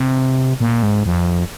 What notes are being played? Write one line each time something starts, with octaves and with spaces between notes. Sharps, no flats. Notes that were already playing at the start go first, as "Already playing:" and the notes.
Already playing: C3
A#2
G#2
F2